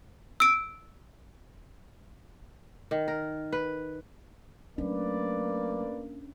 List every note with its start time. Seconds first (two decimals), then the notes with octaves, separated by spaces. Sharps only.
0.40 E6 D7
2.91 D#3
3.08 A#4
3.53 B4
4.78 F#3 A3 A#3 C#4 D4 B4 D5